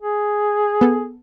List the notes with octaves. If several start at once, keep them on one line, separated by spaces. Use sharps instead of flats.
G#4
B3 A4